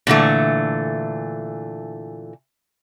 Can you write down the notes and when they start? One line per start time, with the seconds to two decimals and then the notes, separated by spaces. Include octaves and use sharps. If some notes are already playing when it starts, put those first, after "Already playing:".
0.07 A#2 D3 E3 A3